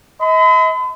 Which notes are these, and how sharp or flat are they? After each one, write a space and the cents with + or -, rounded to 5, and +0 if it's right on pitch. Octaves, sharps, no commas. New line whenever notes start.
D#5 +45 B5 +45